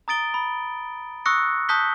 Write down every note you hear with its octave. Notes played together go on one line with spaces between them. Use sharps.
A#5 D#6 A6 D7 G7
B5
C#6 D#6 E6 F#6 A#6 C#7
A5 D#6 F#6 G6 B6 G7